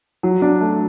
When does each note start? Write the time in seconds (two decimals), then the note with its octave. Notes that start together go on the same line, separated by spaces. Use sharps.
0.23 F#3
0.42 D4
0.61 A3